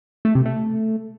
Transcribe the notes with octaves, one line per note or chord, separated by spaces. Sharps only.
A3
C3
A3